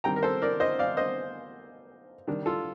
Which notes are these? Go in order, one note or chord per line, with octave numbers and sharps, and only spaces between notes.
D#3 G3 C4 G5 A#5
A#4
A4 C5
A#4 D5
C5 D#5
D5 F5
C5 D#5
D#3 G3 D4
F4 A4